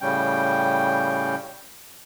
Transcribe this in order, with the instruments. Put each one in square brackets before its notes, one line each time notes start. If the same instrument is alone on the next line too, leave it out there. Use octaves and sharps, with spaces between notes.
[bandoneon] A2 C#3 G3 C#4 G5